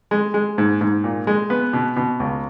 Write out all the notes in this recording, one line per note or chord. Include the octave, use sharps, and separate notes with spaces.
G#3
G#3
G#2
G#2
A#2
G#3
B3
B2
B2
C#2